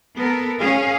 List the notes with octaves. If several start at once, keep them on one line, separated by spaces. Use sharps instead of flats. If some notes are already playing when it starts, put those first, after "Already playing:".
B3 A4 A#4
C#4 G#4 F5